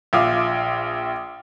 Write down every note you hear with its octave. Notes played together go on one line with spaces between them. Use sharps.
A#1 F4 E5 F5 D6 D#6